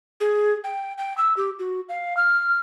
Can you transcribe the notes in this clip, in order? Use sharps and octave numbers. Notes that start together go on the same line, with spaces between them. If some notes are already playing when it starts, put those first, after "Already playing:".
G#4
G5
G5
E6
G4
F#4
F5
F6